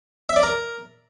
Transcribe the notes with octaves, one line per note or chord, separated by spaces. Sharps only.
E5
D5
A#4